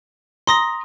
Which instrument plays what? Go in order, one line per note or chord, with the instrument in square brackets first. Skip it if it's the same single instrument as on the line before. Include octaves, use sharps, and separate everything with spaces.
[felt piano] A#5 [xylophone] C6 D#6 A#6